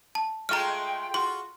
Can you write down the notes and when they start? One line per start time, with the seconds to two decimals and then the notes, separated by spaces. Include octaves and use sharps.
0.15 A5
0.49 G#3 A3 F4 G5 A#5 F6
1.14 F4 F#4 C6